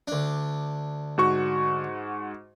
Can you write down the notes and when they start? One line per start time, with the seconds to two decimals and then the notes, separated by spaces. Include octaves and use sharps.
0.08 D2 D4
1.18 G#2 F#4 C#6